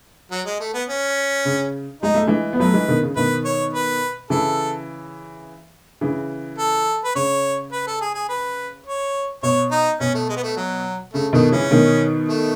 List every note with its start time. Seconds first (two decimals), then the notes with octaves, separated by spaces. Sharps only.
0.31 F#3
0.46 G#3
0.60 A3
0.74 B3
0.89 C#4
1.45 C#3
2.02 G#3 D#4
2.14 A3
2.27 E3 G#3
2.53 B3
2.60 F#3 A3 B4
2.73 E3 G#3
2.88 B2 D#3
3.03 C#3
3.16 B2 D#3 B4
3.45 C#5
3.73 B4
4.30 C#3 E3 A4
6.01 C#3 E3
6.58 A4
7.04 B4
7.15 C#3 C#5
7.72 B4
7.87 A4
8.01 G#4
8.15 G#4
8.29 B4
8.86 C#5
9.43 B2 C#5
9.71 D#4
10.00 B2 C#4
10.14 A3
10.29 G#3
10.36 B3
10.43 A3
10.56 F#3
11.14 C#3 A3
11.33 B2 D#3 A3
11.52 C#3 E3 C#4
11.71 B2 D#3
12.29 A3